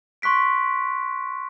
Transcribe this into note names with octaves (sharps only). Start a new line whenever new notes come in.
C6 C#6 F#6 B6 D7